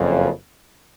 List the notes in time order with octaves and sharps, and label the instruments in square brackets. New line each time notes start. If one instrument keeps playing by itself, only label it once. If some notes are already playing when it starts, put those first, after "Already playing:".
Already playing: [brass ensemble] F#1 F2 C#3